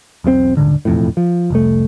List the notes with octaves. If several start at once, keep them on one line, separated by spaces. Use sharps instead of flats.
E1 B1 A#2 C4
D#1 G#1 C#2 D3
E1 F2 A2
F3
F1 C2 A3